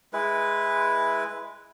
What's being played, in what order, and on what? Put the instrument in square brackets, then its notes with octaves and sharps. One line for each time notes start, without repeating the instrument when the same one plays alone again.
[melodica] G#3 E4 B4